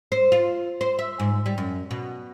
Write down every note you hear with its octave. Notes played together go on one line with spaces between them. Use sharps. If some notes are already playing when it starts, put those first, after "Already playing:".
C5
F4
C5
E5
G#2
G3
F#2
B2